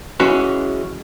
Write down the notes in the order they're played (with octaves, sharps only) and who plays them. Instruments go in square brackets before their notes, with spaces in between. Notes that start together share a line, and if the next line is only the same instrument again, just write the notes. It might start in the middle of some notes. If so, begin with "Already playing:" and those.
[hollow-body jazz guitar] E3 G#3 C#4 F#4 B4